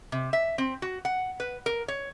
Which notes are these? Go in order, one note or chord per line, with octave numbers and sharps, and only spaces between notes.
C3
E5
C4
F#4
F#5
B4
A#4
C#5